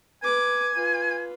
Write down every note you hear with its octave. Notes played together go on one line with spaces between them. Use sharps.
B4 G#5 D6
F4 B4